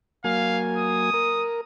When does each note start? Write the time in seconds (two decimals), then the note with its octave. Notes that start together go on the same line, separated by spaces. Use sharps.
0.24 F#3 A#3 F5 G#5
0.78 D#6
1.13 A#4